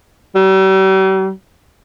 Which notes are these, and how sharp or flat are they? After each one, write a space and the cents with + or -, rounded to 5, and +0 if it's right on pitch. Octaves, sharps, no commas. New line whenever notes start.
G3 -45